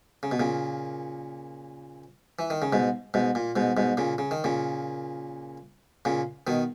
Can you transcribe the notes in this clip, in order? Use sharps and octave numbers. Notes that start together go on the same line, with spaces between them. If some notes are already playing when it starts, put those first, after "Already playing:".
C#3
B2
A#2 C#3
E3
D#3
C#3
G#2 B2
G#2 B2
A#2
G#2 B2
G#2 B2
A#2 C#3
C#3
D#3
A#2 C#3
A#2 C#3
B2 D#3